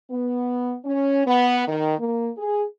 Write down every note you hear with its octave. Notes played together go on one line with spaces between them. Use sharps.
B3
C#4
B3
D#3
A#3
G#4